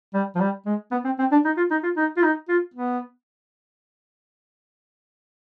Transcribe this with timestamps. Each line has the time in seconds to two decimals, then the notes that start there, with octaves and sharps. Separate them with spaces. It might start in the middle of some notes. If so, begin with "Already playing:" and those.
0.14 G3
0.35 F3
0.41 G3
0.66 G#3
0.92 B3
1.05 C4
1.19 C4
1.32 D4
1.45 D#4
1.57 F4
1.71 D#4
1.83 F4
1.97 D#4
2.17 F4
2.23 D#4
2.49 F4
2.74 B3